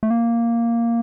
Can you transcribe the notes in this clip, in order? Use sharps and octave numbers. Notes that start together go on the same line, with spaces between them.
A3
A#3